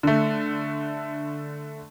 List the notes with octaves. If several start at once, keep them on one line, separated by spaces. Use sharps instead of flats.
D3 A3